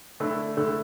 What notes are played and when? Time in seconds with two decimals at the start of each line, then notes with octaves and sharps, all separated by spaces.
0.20 D3 A3 E4
0.57 D3 A3 E4